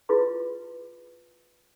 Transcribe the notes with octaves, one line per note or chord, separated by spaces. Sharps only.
E4 F4 G#4 B4 B5 C6